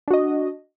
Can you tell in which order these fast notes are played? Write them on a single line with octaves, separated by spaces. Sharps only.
D4 F#4 D#5